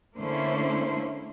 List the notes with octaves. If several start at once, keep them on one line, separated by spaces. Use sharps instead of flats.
D3 A3 A#3 C#4 E4 C5